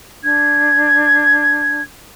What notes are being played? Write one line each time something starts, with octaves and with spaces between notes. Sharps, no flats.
D4 G#6